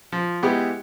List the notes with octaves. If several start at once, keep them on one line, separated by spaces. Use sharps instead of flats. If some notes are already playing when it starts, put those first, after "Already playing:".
F3
G#3 B3 E4 G4